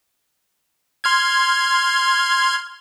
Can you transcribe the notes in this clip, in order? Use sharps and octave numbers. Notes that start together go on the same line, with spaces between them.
C6 F6 G#6